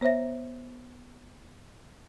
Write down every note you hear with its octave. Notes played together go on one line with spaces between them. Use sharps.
B3 C5 C#5 E5 A#6